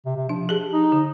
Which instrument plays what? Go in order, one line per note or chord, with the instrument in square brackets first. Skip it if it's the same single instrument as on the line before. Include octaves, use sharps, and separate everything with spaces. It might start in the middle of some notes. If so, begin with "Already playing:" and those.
[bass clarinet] C3
C3
[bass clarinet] F3 [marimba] D4
[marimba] G4 G#4
[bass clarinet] D#4
[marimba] D3